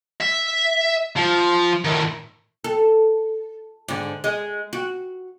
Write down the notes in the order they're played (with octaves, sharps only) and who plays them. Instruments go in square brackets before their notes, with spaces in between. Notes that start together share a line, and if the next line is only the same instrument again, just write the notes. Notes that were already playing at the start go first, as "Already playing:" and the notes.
[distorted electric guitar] E5
F3
A2 D#3
[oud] A4
G#2 D3
G#3
F#4